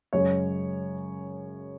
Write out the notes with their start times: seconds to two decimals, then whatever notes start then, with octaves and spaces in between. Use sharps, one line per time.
0.13 F#2 C#3 G#3 C#5